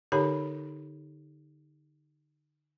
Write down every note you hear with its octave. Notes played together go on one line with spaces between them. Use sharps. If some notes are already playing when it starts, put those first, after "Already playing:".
D3 D#4 G4 A#4 C#5 B5